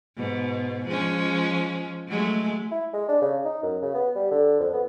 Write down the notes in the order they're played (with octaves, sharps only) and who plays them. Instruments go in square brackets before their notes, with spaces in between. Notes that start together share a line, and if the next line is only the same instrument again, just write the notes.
[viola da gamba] G#2 B2
F3 G#3 C#4
F#3 G#3 A3
[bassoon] E4
G#3
D4
C#3
D#4
F#2
C#3
B3
G3
D3
F2
B3